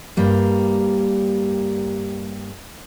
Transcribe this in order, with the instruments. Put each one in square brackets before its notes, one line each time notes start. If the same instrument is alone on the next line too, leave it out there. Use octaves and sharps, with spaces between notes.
[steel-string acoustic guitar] G2 G3 A#3